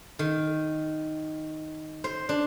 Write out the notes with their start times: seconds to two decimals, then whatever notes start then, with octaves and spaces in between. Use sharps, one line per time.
0.19 D#3
2.04 C5
2.29 D4